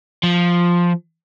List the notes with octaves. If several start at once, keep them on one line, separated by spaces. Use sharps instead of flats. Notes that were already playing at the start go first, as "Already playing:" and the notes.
F3